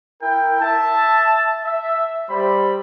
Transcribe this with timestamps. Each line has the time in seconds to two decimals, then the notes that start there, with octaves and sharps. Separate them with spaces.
0.21 E4 A#4 G5
0.60 E5 A5
1.64 E5
2.28 G3 C5 B5